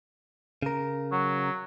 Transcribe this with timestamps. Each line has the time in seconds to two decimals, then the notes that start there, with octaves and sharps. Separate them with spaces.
0.62 C#3 A#4
1.12 F#3